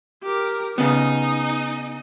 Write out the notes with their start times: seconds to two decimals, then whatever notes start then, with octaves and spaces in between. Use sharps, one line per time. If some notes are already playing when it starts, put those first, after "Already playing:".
0.23 G4 A#4
0.78 C#3 B3 D#4 D#5